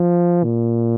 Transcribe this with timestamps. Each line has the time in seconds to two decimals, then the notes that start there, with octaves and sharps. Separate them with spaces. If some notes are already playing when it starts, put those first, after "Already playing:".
Already playing: F3
0.44 A#2